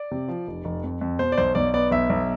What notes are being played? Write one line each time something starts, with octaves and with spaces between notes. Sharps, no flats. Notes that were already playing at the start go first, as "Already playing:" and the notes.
Already playing: D5
C3
F3
F1
F1
F2
F2
B2 C5
D5
B1 C5
B1 D5
B3 D5
B1 E5
B1